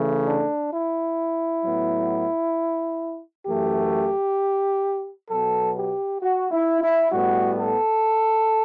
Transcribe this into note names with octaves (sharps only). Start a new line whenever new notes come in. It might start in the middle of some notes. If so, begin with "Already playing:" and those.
Already playing: C#3 E3 A3
D4
E4
A2 F#3 B3
F#2 E3 A3 G4
B2 F#3 B3 A4
G4
F#4
E4
E4
A2 G3 B3 F#4
A4